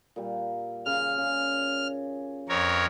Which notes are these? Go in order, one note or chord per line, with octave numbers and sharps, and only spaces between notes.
A#2 G3
C#3 F6
C#3 G#4
F2 A#4 C#5